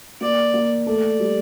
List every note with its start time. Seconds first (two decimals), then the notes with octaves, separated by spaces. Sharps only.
0.21 A#3 D5
0.54 A#3
0.87 A3 D5
1.20 G3